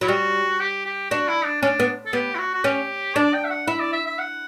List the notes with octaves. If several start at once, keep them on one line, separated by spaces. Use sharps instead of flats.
F#3 E4
G3 F#4
G4
G4
D4 F#4
E4
D4
C#4 D4
B3
A4
B3 G4
E4
F#4
F#4
C#4 G4
D4 D5
G5
E5
F#5
E4 E5
D5
E5
E5
F#5